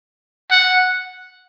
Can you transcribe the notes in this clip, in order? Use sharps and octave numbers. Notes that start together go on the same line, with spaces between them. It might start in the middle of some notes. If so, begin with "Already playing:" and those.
F#5